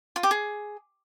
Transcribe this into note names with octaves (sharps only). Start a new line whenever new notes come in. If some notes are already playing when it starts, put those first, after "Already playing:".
F4
G4
G#4